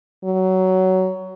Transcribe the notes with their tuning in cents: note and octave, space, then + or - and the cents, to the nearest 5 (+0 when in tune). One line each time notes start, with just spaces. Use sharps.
F#3 +15